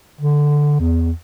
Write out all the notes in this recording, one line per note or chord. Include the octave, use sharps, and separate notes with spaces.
D3
E2